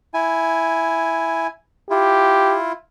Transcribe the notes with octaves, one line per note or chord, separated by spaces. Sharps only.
E4 G#5
E4 F4 G4